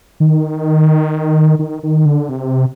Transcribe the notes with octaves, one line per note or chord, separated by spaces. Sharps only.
D#3
D#3
D#3
D3
C3